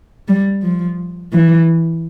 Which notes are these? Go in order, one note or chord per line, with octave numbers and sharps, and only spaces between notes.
G3
F3
E3